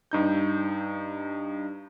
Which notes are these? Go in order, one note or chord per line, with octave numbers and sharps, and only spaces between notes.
G2 D#4 G6